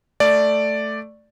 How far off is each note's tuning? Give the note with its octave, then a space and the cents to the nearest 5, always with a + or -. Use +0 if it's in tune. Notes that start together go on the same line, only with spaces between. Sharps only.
A3 +0 D5 +0